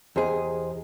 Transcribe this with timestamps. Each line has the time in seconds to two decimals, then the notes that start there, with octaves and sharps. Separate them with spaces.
0.16 E2 G4 G#4 C5 D#5